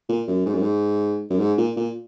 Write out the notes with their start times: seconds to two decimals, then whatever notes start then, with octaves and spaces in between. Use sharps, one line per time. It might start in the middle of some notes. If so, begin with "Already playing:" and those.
0.09 A#2
0.28 F#2
0.46 G#2
0.54 F#2
0.62 G#2
1.30 F#2
1.40 G#2
1.58 A#2
1.77 A#2